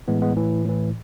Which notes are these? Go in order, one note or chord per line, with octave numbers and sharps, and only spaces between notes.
A2 E3 G#3 B3
G#3 B3
A2 E3
A2 E3